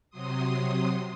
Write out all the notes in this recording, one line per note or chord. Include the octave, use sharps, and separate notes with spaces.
C3 F#3 C6 D#6